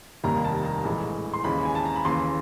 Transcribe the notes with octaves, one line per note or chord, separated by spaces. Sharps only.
F1 D#2 D#3 G3 A#3 A#5
A5
A#5
A#1 A2 E3 G#3
C6
D#2 C#3 E3 G#3 B5
G#5
A5
A#5
B5
D#2 C#3 E3 C6